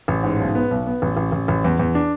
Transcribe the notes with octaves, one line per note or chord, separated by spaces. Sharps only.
A1
G#2
B1
B3
B1
B3
A1
A1
A1
A1
E2
E2
D4